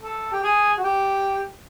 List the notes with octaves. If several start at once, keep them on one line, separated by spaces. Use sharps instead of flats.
A4
G4
G#4
F#4
G4